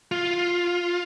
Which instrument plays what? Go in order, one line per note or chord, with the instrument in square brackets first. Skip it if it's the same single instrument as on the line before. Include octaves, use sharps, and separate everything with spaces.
[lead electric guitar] F4